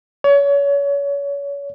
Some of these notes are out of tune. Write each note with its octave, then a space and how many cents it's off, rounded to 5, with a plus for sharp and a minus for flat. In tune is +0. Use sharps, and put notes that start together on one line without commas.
C#5 +30